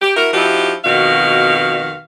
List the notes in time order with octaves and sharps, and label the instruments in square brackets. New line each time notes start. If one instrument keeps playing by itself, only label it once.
[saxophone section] G4
E4 F#4 A#4
F3 D#4 E4 F#4 G4
F2 B2 D#3 F#4 F5